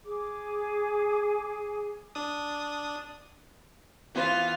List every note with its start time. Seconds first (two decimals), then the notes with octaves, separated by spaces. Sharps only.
0.04 G#4 D6
2.15 D4 D#6
4.15 E3 B3 F4 C5 F5